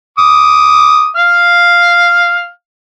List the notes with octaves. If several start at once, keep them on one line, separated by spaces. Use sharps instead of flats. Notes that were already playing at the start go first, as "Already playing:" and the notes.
D6 D#6
F5 F6